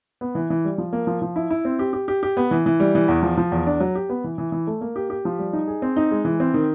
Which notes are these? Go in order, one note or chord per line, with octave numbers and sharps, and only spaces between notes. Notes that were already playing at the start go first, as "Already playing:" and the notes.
B3
E3
E3
G3
F3
A#3
F3
F3
E4
E4
C4
G4
G4
G4
G4
B3
E3
E3
G3
E3
E2
F3
F3
E2
D4
F#3
G4
B3
E3
E3
E3
A3
A#3
G4
G4
F3
G3
D#4
G#4
C4
D#4
G#3
E3
C4
D#3